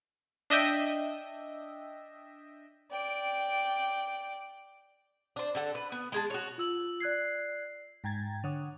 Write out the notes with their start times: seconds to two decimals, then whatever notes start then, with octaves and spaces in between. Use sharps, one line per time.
0.50 D4 D#5 E5 G5
2.91 D5 G5
5.36 D4 C5
5.55 D3 A4 F#5
5.75 B4
5.92 B3
6.12 G#3 G#4 A5
6.30 F#4 C#5
6.58 F4 E6 F#7
7.00 D5 F#6 G#6 C7
8.04 G#2 G5 A#5 G#6 A6
8.44 D3 C#5 F#5 D#6